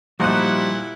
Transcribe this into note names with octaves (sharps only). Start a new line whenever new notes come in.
A#2 F3 G3 D#4 E4 F#4 F#5 F#6